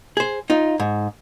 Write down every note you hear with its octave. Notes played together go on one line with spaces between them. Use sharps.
G#4 C5
D#4 F4
G#2